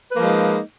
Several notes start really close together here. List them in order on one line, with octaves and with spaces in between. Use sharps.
B4 A#3 F3 G#3 D#4